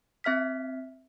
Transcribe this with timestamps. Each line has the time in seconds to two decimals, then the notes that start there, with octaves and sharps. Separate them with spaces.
0.24 C4 E5 F6 B6